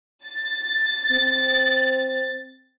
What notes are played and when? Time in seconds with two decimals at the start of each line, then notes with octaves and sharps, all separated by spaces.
0.25 A6
1.11 C4